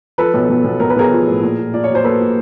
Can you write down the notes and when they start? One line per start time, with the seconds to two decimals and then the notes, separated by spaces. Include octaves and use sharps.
0.18 F3 A4 B4
0.34 B1
0.49 B1
0.64 B1
0.80 B1 A#4
0.90 B4
0.96 B1 G#4 A#4
1.12 F3
1.27 A2
1.43 A#2
1.58 A#2
1.74 A#2 D5
1.84 C#5
1.89 F#3
1.95 C5
2.04 A#3 A4 B4
2.20 A#2